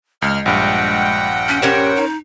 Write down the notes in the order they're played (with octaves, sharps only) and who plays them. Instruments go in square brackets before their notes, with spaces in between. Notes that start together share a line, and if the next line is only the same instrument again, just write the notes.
[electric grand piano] C#2 [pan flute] G#3 [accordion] F6
[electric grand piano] A#1 G2 [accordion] F#5 G5
[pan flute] C#4
[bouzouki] C#4 A#4 C5 [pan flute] G4
[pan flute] D#4